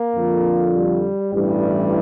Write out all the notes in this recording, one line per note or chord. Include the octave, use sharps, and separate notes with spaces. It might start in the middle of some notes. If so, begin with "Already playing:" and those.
Already playing: A#3
F2 D3 F3
G3
A1 G2 E3 G3